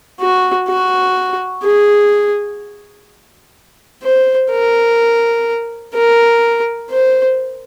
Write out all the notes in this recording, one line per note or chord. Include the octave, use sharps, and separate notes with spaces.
F#4
F#4
G#4
C5
A#4
A#4
C5